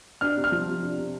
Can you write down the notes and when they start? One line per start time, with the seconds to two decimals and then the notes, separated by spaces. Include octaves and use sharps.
0.21 D4 F6
0.37 C3
0.44 F6
0.52 F3
0.67 C3
0.83 D4
0.98 C3